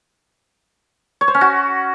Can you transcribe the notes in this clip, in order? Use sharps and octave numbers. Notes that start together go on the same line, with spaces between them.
C#5
C5
C#4
F#4